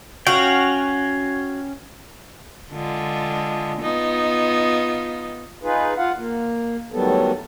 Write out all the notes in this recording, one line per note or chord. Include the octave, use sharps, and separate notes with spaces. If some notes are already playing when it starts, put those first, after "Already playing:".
C#4 F#4 F5 G5
D3 G#3 F4
B3 D#4 F4
D#4 F4 G#4 B4
F4 F5 F#5
A#3
A2 D#3 F#3 G3 B3 A4